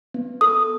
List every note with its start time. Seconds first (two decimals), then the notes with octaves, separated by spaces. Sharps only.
0.14 B3
0.41 A4 D#6